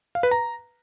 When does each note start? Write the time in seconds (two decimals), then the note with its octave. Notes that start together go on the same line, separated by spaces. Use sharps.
0.15 F5
0.23 B4
0.31 A#5